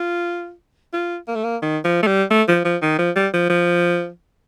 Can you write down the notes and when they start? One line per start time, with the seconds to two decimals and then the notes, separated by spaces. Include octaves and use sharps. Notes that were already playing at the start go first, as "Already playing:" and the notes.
Already playing: F4
0.93 F4
1.28 A#3
1.35 A3
1.44 A#3
1.62 D#3
1.84 F3
2.03 A3
2.07 G3
2.30 A3
2.48 F3
2.65 F3
2.82 D#3
2.99 F3
3.16 G3
3.33 F3
3.50 F3